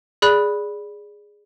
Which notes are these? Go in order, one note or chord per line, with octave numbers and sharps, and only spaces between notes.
G#4 D5 B5 F#6